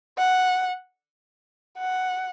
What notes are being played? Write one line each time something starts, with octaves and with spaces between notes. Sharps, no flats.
F#5
F#5